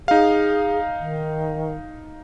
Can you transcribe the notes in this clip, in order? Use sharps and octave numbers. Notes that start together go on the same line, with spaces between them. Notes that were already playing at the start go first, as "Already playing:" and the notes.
D#4 G#4 F5
D#3